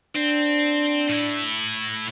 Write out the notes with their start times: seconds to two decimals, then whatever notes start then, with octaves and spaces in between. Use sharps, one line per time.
0.16 C4 D4
1.09 A2 E4